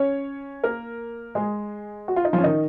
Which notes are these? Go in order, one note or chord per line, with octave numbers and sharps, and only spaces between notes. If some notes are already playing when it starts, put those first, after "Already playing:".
Already playing: C#4 C#5
A#3 A#4
G#3 G#4
F#4
F4
D#4
F3 F4
C#4
D#3 D#4